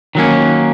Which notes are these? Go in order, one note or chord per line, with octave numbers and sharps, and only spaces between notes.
D#3 F#3 A#3 C#4